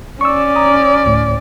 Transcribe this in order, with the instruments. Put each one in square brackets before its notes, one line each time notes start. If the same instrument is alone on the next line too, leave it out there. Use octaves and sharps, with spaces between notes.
[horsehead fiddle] C#4 D5 [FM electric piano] C#6 E6
[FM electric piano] A#5 D#6
D2 A2